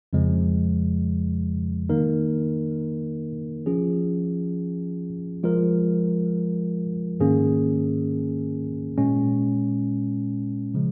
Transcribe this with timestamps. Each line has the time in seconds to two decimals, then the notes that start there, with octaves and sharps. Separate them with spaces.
0.13 F2 C#3 F3 G#3
1.89 D#3 A#3 D#4 A#4
3.66 F3 C#4 F4 G#4
5.43 F3 G#3 F4 A#4
7.20 G#2 D#3 A#3 C#4 G#4
8.98 A#2 G#3 C#4
10.74 C#3 F3 G#3